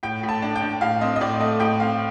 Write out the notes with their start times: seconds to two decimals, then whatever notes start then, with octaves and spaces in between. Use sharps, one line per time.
0.03 A2 G5
0.23 A2
0.29 A5
0.42 D4
0.56 G5
0.62 D4
0.81 A2 F5
1.01 C4 D#5
1.16 D#5
1.21 A2 D5
1.40 A3 D#5
1.60 A2 G5
1.80 C4 F5